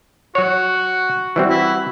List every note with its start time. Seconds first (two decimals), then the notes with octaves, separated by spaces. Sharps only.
0.35 F#3 F#4 C#5
1.36 E3 G3 C4 F#4
1.50 E4